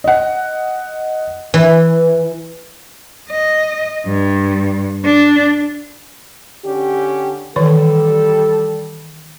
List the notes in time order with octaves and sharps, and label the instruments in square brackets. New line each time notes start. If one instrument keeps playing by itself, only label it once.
[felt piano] D#5 F#5
[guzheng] E3 [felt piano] B4
[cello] D#5
G2
D4
[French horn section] D3 C#4 G4
[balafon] D#3 E3 C#5 [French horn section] G3 A4